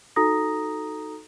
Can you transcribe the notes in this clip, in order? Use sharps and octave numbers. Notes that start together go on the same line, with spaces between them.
D#4 F#4 A4 A#5 D#6 A#6